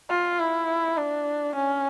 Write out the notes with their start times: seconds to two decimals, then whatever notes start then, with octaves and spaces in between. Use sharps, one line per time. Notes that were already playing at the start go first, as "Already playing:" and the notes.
0.10 F4
0.39 E4
0.97 D4
1.55 C#4